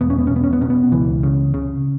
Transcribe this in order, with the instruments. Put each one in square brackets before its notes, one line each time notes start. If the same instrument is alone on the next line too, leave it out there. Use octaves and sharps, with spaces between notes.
[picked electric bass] E1 B3
C#4
B3
C#4
E1 B3
C#4
B3
B2 C#4
B3
C#2 E3
C#3
C#3